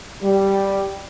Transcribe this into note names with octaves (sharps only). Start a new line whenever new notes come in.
G3